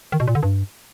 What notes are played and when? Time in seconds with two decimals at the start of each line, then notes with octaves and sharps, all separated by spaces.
0.12 D#3
0.20 B2
0.28 A#2
0.35 D3
0.43 G2